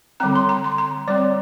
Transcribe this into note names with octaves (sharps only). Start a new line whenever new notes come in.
D3 G3 C4 A#5
C6
A#5
C6
A#5
G3 C4 D5